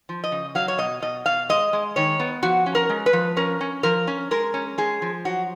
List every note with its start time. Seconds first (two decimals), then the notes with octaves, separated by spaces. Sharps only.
0.09 F3
0.24 D#5
0.32 C#3
0.55 F#3 F5
0.68 C#5
0.78 B2 D#5
1.02 B2 D#5
1.26 B2 F5
1.49 G#3 D#5
1.73 G#3
1.96 D#3 C#5
2.20 B3
2.43 F3 F#4
2.66 C#4
2.75 A#4
2.89 G#3
3.06 B4
3.13 F3
3.37 C#4 A#4
3.61 C#4
3.83 F3 A#4
4.07 C#4
4.31 G#3 A#4
4.54 C#4
4.78 G#3 G#4
5.02 F3
5.25 F#3 F#4